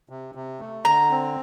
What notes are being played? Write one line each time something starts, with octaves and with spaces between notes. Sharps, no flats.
C3
C3
A3
D3 A#5
C4